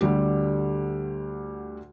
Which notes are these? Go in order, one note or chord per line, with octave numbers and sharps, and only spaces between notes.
D2 D3 G3 G4